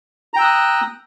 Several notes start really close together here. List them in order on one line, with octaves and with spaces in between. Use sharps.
A#5 G5 E6 F#6 D#6